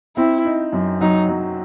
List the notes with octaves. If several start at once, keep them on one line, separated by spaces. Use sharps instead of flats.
C4 E4
D#4
F#2
F#3 D#4
F#3